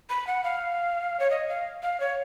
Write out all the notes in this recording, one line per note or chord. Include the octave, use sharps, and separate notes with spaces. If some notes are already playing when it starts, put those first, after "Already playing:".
B5
F#5
F5
C#5
D#5
F5
F5
C#5